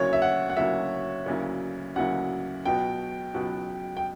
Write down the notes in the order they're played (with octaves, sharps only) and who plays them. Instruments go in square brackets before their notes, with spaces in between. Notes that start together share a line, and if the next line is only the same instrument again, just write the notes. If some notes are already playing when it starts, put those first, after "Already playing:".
Already playing: [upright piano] D2 C#3 F#3 A#3 E4 [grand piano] C#5
[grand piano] E5
F#5
F#5
[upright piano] D2 C#3 F#3 A#3 E4 [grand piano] E5
[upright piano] D2 C#3 F#3 A#3 E4
[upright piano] D2 C#3 F#3 A#3 E4 [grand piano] F#5
[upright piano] C#2 B2 F#3 B3 F#4 [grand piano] G5
[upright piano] C#2 B2 F#3 B3 F#4
[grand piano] G5